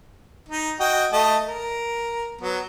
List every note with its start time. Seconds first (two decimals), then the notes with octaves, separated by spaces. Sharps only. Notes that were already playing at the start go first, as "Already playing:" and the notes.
0.49 D#4
0.80 F#4 D#5 G5
1.12 A3 D#5 A5
1.48 A#4
2.41 F#3 B3